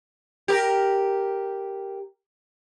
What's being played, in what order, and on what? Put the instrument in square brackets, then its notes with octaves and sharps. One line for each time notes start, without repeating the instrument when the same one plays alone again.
[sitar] G4 A#4